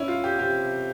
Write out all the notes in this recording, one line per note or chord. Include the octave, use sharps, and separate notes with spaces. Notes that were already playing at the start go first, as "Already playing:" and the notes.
Already playing: C#4 E4
F4
G4
C3 G4